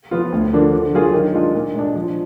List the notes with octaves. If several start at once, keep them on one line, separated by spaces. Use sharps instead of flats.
F3 B3 F4
D2
D3 F3 A#3 D4
D3
F#3 A#3 F4 G#4
D#3
G#3 D4 F4
A#2
G#3 D4
F3